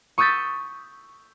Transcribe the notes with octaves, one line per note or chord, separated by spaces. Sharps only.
C#6 D#6 E6 G6 A6 B6